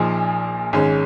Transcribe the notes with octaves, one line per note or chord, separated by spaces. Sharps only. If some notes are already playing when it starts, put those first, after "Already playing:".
Already playing: A#1 A#2 F3 D#4 G#4
G#1 G#2 G#3 C#4